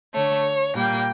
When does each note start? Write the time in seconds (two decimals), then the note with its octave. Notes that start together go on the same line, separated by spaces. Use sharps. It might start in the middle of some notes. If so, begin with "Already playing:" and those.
0.14 D3 A3 C#5
0.75 A#2 G3 A#3 G5